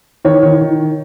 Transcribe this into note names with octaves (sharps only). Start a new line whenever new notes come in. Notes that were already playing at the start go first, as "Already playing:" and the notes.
D#3 C#5
D#3
D#3